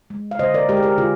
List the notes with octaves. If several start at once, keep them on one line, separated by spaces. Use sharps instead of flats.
G#3
F5
D3 C5 D#5
A#4 D5
G#3 G4 A#4
G#4
G4 A#4
D3 F4 G#4